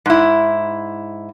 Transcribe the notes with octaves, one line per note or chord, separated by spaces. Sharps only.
G#2 E4